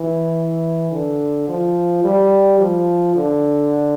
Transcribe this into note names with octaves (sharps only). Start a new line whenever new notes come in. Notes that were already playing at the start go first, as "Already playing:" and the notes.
Already playing: E3
D3
F3
G3
F3
D3